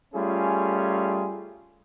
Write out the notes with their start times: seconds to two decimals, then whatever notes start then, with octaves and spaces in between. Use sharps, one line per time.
0.15 G3 A3 C#4 F4 G#4